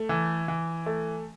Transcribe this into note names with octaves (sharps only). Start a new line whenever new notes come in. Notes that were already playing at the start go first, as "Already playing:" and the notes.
Already playing: A3
E3
E3
A3